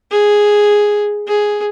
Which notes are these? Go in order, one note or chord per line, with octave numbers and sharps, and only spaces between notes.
G#4
G#4